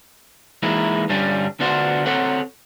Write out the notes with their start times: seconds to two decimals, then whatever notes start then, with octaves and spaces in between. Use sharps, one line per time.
0.63 E3 G#3 A#3 D#4 E4
1.09 G2 D3 G3 C#4 D4 F4
1.60 D3 B3 D4 F4 F#4 C5
2.06 C4 A4 C5 C#5 F#5